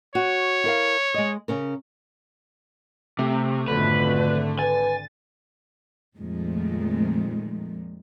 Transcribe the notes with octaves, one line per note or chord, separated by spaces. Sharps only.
F#4 C#5
E4 A#4 F5
G#3 D#5
C#3 C#4 A#4
C3 A3
G#1 F2 B2 D3 B4
B4 G#5 A6
F2 A#2 D#3 F3 G#3 A3